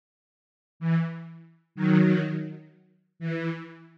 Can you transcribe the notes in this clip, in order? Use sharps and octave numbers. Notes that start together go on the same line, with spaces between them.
E3
D#3 F#3
E3